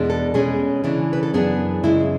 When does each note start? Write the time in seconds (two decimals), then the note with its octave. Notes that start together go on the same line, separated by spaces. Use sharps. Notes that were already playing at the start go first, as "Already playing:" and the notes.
Already playing: E2 B2 G#3 D4
0.10 A4
0.34 B2 G#3 C#4 G#4
0.84 C#3 E3 A3 D4
1.13 B4
1.23 A4
1.34 F#2 E3 B3 D4 G#4
1.83 F#2 C#3 G#3 E4